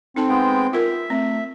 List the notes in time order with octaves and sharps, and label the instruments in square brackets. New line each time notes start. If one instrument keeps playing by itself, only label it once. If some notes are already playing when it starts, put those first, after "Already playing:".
[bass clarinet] C4 [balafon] D#4 A4 A5
[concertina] G#3 B3 G5
[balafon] F4 A#4 [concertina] E5
[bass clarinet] A3 [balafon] C4